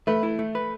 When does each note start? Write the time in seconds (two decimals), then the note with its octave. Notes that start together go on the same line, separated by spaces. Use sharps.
0.07 A3 B4
0.23 E4
0.39 A3
0.55 B4